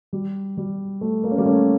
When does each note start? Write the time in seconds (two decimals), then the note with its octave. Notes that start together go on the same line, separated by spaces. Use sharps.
0.13 G3
0.57 G3
1.01 A3
1.24 A#3
1.31 C#4
1.38 G3 A#3
1.45 A3 C#4